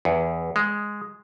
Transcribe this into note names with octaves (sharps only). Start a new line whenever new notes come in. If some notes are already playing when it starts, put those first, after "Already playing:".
E2
G#3